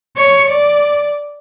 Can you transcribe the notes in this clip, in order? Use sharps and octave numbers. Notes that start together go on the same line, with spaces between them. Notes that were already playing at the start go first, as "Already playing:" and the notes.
C#5
D5